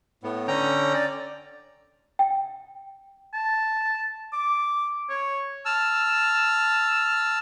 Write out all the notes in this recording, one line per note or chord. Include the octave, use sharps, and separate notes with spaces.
A2 B3
D3 C#4 G5 A#5
D5
G5
A5
D6
C#5
A5 E6 F6